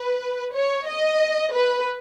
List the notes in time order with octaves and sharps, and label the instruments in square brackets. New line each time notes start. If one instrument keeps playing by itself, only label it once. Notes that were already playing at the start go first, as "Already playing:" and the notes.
Already playing: [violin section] B4
C#5
D#5
B4